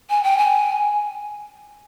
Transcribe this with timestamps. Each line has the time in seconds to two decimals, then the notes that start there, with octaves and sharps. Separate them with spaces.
0.10 G#5
0.23 G5
0.38 G#5